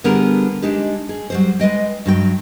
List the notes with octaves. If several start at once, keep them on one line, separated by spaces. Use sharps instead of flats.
D3 G3 B3 G4 G#4 A#4
G#3 D4 D#4 G4
G#4
F#3 G3 C5
G#3 B4 D#5 G5
G2 F#3 G5